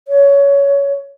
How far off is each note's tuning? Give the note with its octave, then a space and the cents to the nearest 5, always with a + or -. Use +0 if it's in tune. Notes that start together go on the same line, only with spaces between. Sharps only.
C#5 +20